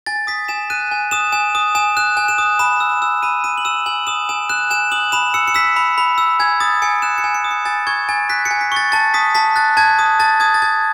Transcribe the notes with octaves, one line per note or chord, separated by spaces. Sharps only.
G#5 A6
D#6 B6
G#5 E7
F#6 D#7
G#5
D#6 E7
G#5 E7
D#6
G#5 E7
F#6 E7
G#5
E7
D#6
B5 E7
E6
E6
B5 D#7
B5 D#7
F#7
E6 E7
G#5 F#7
D#6 E7
G#5 E7
F#6 E7
G#5 E7
D#6 F#7
B5 E7
E6 C#7
C#7
E6 B6
B5
B5
E6
G#5 G#6
D#6 A6
G#5 C#7
F#6 E7
C#7
G#5
C#7
D#6
C#7
G#5 A6
C#6 G#6
G#5 A6
F#6 B6
C#7
G#5
B6
C#6 A6
A5 A6
D#6 B6
A5 B6
F#6 A6
A5 G#6
D#6
A5 A6
D#6 G#6
A6
A5 G#6